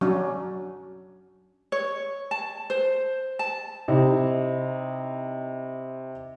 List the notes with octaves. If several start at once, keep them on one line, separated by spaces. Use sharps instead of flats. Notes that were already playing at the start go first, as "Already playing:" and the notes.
F#3 C#4 D4
C#5
A5
C5
A5
C3 D#4 E4